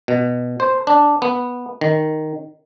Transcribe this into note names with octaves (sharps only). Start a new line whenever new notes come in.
B2
C5
D4
B3
D#3